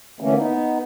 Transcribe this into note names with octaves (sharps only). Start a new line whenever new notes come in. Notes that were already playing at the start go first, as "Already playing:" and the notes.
D3 E3 A3 A#3 C#4
B3 D#4